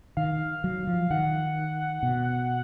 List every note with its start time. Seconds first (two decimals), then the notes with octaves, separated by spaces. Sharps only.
0.17 D#3 F5
0.64 F#3
0.87 F3
1.10 D#3 F#5
2.03 B2